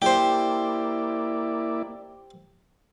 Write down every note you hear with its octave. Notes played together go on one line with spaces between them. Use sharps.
A#3 E4 G4 C5 D5